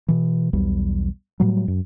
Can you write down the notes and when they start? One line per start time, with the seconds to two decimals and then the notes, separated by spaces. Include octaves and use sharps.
0.08 B2 E3
0.53 B1 E2 G3
1.40 A2 F#3 G3
1.68 F#2